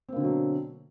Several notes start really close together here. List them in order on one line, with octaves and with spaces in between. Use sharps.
C4 A#3 D3 B2 F#3